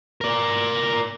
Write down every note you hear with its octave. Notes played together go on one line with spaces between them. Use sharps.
A#4 D5